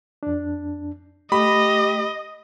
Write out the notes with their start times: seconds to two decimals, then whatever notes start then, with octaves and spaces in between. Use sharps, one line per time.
0.23 F2 D4
1.32 A3 G4 D#5 B5